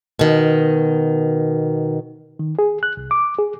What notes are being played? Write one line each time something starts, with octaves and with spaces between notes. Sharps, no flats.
B2 D#3
D#3
G#4
F#6
C2
D6
G#4